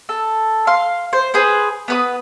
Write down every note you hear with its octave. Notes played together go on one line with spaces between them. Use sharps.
A4
F5 C6
C5
G#4 B4 C5
B3 B4 D#6